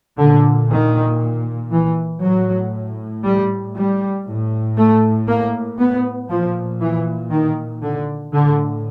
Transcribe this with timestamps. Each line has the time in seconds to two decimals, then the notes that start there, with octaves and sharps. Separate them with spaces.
0.18 A#2 D3
0.70 D#3
1.72 E3
2.22 A2 F#3
3.24 G3
3.75 G3
4.26 A2
4.77 A3
5.28 A#3
5.79 B3
6.30 A#2 F3
6.80 E3
7.31 D#3
7.82 D3
8.33 A2 D3